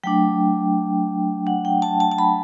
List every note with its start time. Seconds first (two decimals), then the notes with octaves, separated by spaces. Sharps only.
0.04 F#3 A3 D4 G5
1.47 F#5
1.65 G5
1.82 A5
2.00 A5
2.11 A5
2.18 B5